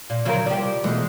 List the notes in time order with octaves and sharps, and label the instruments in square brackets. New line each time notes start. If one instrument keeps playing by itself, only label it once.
[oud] A#2
[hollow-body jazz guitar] D2 A#4 [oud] C#3 F3 F#3
[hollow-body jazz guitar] C2 D5 [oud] F3 G4
[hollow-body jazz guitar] B2 E3 A3 [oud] G#3